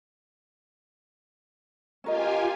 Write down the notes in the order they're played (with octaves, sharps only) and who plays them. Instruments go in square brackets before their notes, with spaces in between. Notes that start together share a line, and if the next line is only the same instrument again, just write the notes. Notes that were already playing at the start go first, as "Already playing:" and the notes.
[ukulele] C#4 A#4 D#5 [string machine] F4 G4 G#5